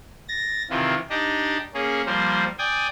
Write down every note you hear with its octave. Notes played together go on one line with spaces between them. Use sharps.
A6 A#6
C3 D#3 E3 F4
D4 D#4 G4 D#5
A#3 C#4 G#4
F3 G3 A#3 C5
D5 G5 G#5 D#6